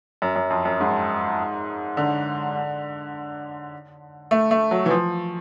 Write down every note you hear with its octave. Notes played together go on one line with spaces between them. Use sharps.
F#2
F#2
F2
F#2
G#2
D3
A3
A3
F#3
E3
F3